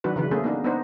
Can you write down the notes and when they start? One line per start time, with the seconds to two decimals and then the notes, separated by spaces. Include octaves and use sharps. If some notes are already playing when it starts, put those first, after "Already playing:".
0.04 D#3 F#3 D4 F#4 B4
0.16 C#3 E3 B4
0.31 A3 A#3 C#4 G#4
0.44 A#3 B3 D4 D#4
0.64 B3 D4 D#4 C5